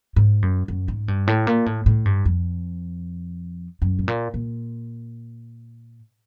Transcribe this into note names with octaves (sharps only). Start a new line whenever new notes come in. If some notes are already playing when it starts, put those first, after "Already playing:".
G#2
F#2
F#2
G#2
G2
A2
A#2
A2
A2
G2
F2
F#2
A2
A#2
A#2